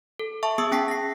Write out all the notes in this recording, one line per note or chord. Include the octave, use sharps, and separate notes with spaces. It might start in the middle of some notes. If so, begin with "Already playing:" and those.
A4
E5 A5 C#6
B3 G#4 C#6 D#6 E6
C#4 G5 A5 B6 C7
A#6 C7